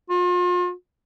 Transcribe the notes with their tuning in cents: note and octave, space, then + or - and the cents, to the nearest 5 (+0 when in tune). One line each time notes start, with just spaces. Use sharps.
F4 +40